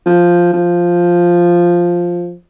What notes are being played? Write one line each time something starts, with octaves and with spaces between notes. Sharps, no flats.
F3
F3